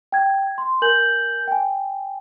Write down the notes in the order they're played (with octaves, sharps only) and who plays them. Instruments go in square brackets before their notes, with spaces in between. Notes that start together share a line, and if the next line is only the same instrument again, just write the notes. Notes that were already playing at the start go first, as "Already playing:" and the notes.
[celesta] G5 G#6
C6
A#4 G#5 G6 F#7
G5 G#5